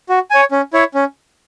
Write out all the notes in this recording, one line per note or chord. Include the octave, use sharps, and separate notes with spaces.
F#4
C#5 G#5
C#4
E4 C#5
C#4